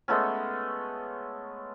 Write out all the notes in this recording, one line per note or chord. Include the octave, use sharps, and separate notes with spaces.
G#3 A3 B3 C#4